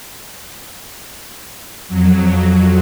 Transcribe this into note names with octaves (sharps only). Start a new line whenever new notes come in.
F2 F#3